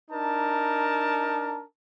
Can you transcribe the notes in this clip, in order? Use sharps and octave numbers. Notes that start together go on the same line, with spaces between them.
D4 D#4 A#4 A5